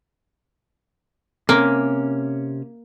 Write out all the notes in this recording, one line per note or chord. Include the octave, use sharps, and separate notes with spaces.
C3 A#3 C#4